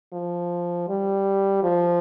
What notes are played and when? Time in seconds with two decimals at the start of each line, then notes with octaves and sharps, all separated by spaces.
0.13 F3
0.89 G3
1.63 F3